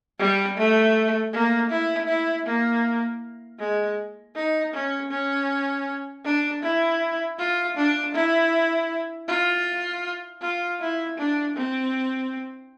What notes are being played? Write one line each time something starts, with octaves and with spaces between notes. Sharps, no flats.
G3
A3
A#3
E4
E4
A#3
G#3
D#4
C#4
C#4
D4
E4
F4
D4
E4
F4
F4
E4
D4
C4